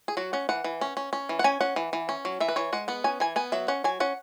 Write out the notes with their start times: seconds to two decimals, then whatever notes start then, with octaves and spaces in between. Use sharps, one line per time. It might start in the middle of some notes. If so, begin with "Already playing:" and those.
0.08 G#4
0.17 F#3 F#4
0.33 C#4 F#5
0.49 E3 F#5
0.64 E3
0.81 C#4
0.97 C#4
1.13 C#4
1.29 E3
1.39 F#5
1.44 C#4 G#5
1.61 C#4 F#5
1.76 E3
1.93 E3
2.09 C#4
2.25 F#3
2.40 E3 E5
2.48 B4
2.56 E3 C#5
2.73 G#3 F#5
2.88 B3 F#5
3.04 C#4 G#5
3.20 E3 G#5
3.36 B3 G#5
3.52 F#3 E5
3.68 C#4 F#5
3.84 F#3 G#5
4.00 C#4 F#5